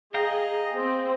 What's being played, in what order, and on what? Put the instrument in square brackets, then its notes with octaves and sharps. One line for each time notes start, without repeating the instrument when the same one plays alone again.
[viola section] G#4 [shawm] D#5 [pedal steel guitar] F5 G5 A#5
[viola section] C4